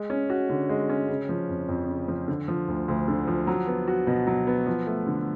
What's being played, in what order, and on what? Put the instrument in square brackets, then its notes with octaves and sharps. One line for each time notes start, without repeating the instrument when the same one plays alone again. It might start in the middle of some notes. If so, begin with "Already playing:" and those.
Already playing: [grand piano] G#3
C#4
F#4
D3
G#3
C#4
C#3
F3
F2
F2
C#3
F3
D3
F3
D2
D2
D3
F3
F#3
B3
F#4
B2
F#3
B3
F3
A3
D3